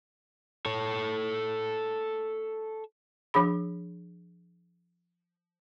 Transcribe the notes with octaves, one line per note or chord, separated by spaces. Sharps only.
A4 C#5
F3 D4 G#4 B5